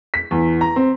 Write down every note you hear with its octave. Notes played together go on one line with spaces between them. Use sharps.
B6
E2
A#5
C4